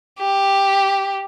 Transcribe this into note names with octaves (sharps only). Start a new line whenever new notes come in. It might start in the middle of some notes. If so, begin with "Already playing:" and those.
G4